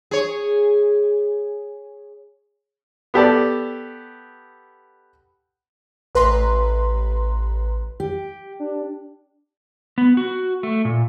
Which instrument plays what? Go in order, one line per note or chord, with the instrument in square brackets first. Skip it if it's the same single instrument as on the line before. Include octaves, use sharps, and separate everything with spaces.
[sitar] G#4 C#5
[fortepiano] B3 G4 A4 D5
[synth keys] A1 B4 A#5 C6
[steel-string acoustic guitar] G4
[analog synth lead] D4
[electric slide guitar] B3
F#4
A3
A#2